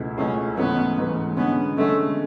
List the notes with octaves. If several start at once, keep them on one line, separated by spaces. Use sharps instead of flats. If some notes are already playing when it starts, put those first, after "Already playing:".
Already playing: C#2 B2 A3 E4 G#4
C#2 B2 A3 C#4 E4 G#4
G#2 E3 A3 B3 C#4
G#2 E3 A3 C#4
D3 G#3 B3 C#4
D3 G#3 A3 C#4